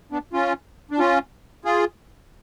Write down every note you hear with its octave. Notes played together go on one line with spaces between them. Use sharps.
B3 D4
C#4 F4
D4
C#4 F4
F4 G#4